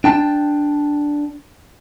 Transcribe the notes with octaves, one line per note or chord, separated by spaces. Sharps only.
D4 G5 A5